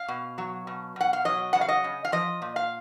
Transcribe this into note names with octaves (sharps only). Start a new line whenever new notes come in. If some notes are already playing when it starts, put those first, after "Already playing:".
Already playing: F5
B2
F#3
B2
B2 F#5
F5
F#3 D#5
C#3 F#5
F5
D#5
C#3
F5
F3 D#5
A#2
F5